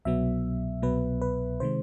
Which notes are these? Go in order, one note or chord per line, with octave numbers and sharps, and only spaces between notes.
C2 B2 F#3 B3 E5
C2 B2 F#3 B3 B4
B4
C3 D#3 G#3 C5